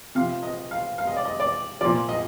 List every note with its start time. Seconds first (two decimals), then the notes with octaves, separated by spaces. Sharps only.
0.15 C3 F3 F5
0.43 D#5
0.71 F5
0.98 F5
1.07 D#5
1.17 D5
1.25 D#5
1.40 D5
1.81 A#2 F3 D5
2.09 D#5